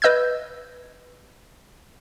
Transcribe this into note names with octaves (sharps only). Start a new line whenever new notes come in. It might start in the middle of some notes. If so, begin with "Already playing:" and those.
B4 D#5 E6 G6 G#6